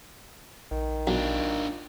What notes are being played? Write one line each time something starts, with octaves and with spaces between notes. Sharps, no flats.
A#1 D#3
B1 D4 F4